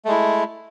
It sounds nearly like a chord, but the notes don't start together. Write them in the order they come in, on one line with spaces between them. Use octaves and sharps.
A3 G#3 E4